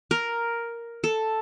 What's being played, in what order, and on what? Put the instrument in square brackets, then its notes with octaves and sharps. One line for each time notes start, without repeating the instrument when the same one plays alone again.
[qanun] A#4
A4